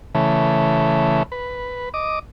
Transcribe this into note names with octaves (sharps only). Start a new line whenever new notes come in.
C#3 E3 A3
B4
D#5 D6